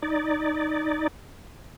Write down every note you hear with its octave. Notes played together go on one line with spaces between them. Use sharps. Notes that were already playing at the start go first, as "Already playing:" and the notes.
D#4 D5